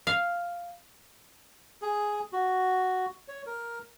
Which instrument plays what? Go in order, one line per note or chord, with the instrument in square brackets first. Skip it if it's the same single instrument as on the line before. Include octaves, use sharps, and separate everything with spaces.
[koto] F5
[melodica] G#4
F#4
C#5
A#4